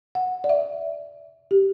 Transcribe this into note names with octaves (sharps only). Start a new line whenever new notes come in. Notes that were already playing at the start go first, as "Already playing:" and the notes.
F#5
D5
E5
G4